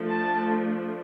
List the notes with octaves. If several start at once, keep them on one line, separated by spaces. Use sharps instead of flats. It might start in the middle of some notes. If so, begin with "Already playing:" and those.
Already playing: F3 A3 D4
A5